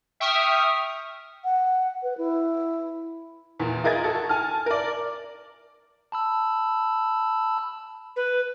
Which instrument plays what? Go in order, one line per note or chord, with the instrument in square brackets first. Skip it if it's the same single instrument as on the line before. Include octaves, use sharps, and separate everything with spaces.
[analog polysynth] E5 G5 C#6 D#6 F6
[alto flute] F#5
B4
E4
[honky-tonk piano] E2 A#2
F4 G#4 A#4 D#5 G#6 A6
F#4 A4
G#5 A5 F6
A#4 D5
[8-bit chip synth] A5 B5 E6
[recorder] B4